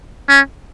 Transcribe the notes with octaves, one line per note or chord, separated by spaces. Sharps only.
C#4